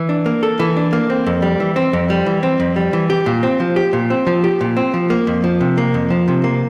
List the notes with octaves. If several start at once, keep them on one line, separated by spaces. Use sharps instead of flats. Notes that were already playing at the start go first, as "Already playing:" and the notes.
Already playing: E3
D4
A#3
A4
E3
D4
A#3
C4
F2
G3
E3
C4
F2
G3
E3
C4
F2
G3
E3
G4
A#2
C4
F3
G4
A#2
C4
F3
G4
A#2
C4
F3
A#3
F2
F3
C3
A#3
F2
F3
C3
A#3